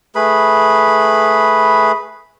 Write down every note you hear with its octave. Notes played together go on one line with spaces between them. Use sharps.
A3 G#4 B4 B5